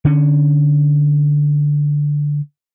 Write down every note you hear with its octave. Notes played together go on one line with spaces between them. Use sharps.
D3 C#4